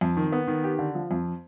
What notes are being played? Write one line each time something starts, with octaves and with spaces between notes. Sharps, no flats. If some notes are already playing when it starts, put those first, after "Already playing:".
F2
D#3
B3
D#3
G4
D3
F3
F2